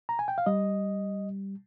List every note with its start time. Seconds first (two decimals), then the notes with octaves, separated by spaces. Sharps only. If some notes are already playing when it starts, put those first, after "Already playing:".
0.09 A#5
0.19 G#5
0.28 G5
0.38 F5
0.46 G3 D#5